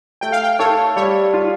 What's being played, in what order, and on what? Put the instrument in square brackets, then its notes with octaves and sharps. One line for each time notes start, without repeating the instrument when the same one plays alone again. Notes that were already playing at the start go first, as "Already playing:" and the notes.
[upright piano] A3 [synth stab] G5
[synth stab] F5
G5
[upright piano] A4 [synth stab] C#5
[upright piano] G3 [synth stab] C#5
[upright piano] F4